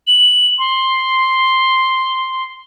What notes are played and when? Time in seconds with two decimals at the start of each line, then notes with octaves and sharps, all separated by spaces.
0.07 F#7
0.59 C6